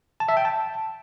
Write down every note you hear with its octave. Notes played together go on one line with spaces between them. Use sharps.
A5
E5
G5
A5